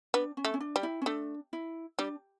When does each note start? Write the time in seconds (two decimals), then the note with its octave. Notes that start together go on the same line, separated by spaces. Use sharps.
0.14 B3 D4
0.37 C#4
0.45 A3
0.54 C#4
0.60 D4
0.76 G3
0.83 E4
1.02 C#4
1.06 A3 D4
1.53 E4
1.99 G3 D4